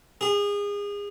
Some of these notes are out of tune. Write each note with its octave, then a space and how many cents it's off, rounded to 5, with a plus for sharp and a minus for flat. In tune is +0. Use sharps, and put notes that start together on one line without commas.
G#4 -30